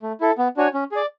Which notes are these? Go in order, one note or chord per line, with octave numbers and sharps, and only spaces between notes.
A3
E4 A4
B3
D4 F#4 C#5 G#5
C#4
G#4 D5